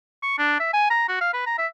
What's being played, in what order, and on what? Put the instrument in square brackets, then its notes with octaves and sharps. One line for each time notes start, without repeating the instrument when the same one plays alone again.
[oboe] C#6
D4
E5
G#5
A#5
F#4
F5
B4
A#5
E5